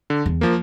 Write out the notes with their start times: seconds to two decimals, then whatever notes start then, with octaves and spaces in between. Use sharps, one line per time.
0.10 D3
0.26 E2
0.41 F3 A#3